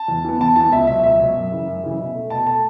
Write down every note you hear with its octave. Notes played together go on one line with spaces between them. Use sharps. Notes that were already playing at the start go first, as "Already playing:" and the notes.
Already playing: A5
E2
E3 B3
E2 A5
E3 B3 A5
C#2 E5
B2 F#3 E5
C#2 E5
B2 F#3
F#2
C#3 E3
F#2
C#3 E3
B2
A3
B2 A5
A3 A5